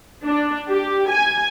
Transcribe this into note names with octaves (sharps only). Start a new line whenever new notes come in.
D4
G4
G#5